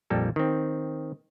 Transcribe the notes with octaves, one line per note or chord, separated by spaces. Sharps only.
A#1 F2 G3 A#3 A4
D#3 C4